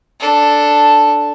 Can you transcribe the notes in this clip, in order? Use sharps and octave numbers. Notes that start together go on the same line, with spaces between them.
D4 A4